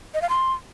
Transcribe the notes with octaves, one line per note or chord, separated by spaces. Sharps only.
D#5
F5
C6